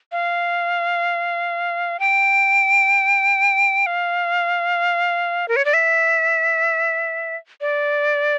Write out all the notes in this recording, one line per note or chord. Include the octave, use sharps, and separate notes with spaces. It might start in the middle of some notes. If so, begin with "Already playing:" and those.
F5
G5
F5
A#4
C#5
D5
E5
D5